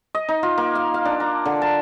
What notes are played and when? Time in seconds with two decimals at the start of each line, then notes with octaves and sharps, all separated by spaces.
0.15 D#5
0.29 D#4
0.43 F4
0.58 A#3
0.75 F5
0.94 F5
1.05 D4
1.20 A#5
1.45 D3
1.62 A5